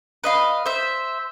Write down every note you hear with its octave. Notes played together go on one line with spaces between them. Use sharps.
B4 D#5 F5
C5 E5